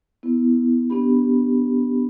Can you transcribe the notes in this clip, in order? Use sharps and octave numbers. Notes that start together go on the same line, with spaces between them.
B3 E4
B3 C#4 D4 G4 B5